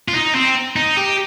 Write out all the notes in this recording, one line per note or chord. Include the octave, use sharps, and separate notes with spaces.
F4
D#4
C4
D#4
G4